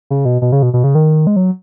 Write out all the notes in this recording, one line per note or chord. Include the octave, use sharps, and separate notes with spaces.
C#3
B2
B2
C#3
B2
B2
C#3
D#3
G#3
F#3